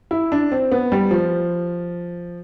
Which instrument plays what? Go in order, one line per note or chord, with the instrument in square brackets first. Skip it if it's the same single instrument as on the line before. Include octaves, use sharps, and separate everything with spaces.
[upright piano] E4
D4
C4
B3
G3
F3